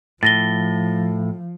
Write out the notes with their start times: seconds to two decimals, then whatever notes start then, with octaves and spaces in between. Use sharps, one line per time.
0.23 A2 F3 A6 A#6 G7